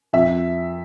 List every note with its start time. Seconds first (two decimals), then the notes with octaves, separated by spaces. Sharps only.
0.13 F2 E5